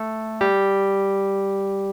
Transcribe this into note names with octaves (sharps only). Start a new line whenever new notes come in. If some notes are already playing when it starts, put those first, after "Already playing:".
Already playing: A3 A4
G3 G4